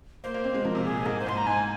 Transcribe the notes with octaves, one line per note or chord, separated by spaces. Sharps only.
A#3 C5
A#3
C4
G#3
F3 A#4
C3
A#2 G#4
A#2
G#2 A#4
C5
G#2 C6
A#5
G#2 G#5